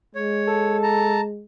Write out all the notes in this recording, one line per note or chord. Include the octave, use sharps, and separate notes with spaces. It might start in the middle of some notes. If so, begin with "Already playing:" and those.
G#3 C#5
A4
A5 A#5